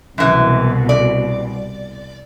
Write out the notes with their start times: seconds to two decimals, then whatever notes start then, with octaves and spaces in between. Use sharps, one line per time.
0.18 C2 F#2 B2 E3
0.89 D5